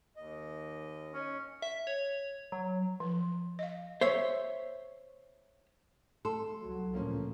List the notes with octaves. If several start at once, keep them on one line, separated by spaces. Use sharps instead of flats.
D#2 D#5
C#4
E5
C#5
F#3
F3
D#5 F5
C5 C#5 E5
A3 A4 C6
C2 F#3
D2 A#2 E3 F3 A#3 C#4